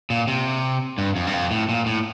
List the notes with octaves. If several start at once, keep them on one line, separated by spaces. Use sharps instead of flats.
A#2
C3
G2
F2
G2
F2
A2
A#2
A2